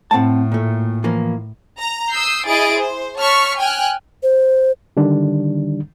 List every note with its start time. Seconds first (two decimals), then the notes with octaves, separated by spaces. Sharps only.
0.11 A2 C4 F#5 A5
0.52 A#2 A3
1.04 E3 F3 A#3
1.77 A#5
2.11 D#6 E6 G6 C7
2.46 E4 G#4 D#5 A6 D7
2.77 C5
3.18 C#5 A5 C#6 F6 B6
3.58 G5 G#5 F6 F#6
4.23 C5
4.97 D3 D#3 G3 D4